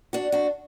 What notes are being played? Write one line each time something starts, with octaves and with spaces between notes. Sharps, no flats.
D4 F#4
D4 F#4